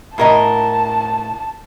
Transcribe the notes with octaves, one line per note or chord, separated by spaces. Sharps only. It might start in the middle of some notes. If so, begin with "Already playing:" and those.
A2 A#4 D#5 A5